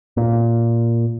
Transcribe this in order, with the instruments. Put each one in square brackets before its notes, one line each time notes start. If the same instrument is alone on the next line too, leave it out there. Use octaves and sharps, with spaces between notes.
[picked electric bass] A#2